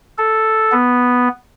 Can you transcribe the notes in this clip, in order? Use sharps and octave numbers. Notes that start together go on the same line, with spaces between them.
A4
B3